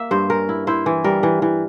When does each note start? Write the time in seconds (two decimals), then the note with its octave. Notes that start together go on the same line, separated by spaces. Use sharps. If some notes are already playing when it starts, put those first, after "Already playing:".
Already playing: A#3 E5
0.11 G2 C5
0.30 C#4 A#4
0.49 E4
0.67 E4 C5
0.86 E3
1.04 G3 A#4
1.23 E3
1.42 E3